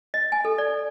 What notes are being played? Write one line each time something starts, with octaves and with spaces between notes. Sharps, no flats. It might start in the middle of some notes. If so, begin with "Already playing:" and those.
D#5
G#5
A4
D5